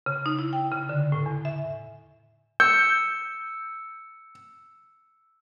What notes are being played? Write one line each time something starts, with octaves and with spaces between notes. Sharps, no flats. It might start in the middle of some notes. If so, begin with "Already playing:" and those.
C#3
D#4
E4
G5
C#3
D3
A2
E2
E5
E6 G6 C#7